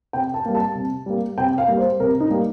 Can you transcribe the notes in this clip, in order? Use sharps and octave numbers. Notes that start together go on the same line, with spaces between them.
C3 G5
A5
G3 A#3
A5
C3
G3 A#3
C3 G5
F5
G3 A#3
C5
C3 A#4
D#4
G3 A#3